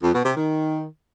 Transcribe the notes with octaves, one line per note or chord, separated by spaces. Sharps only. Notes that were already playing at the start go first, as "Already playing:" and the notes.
F2
B2
C3
D#3